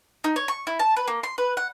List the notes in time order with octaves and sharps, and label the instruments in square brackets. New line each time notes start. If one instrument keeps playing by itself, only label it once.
[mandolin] D#4
C#5
C#6
E4
A5
B4
A#3
C6
B4
F#5